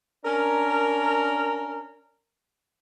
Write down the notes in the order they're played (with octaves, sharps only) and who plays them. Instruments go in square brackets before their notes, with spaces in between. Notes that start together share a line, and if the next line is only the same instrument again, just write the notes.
[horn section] C#4 D4 A#4